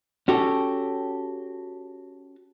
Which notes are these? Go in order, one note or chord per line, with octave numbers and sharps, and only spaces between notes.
C#4 F#4 G4 A4